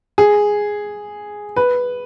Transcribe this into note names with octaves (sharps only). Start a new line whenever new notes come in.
G#4
B4